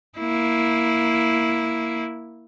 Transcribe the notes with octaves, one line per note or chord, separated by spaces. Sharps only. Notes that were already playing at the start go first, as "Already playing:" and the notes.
A#3 E4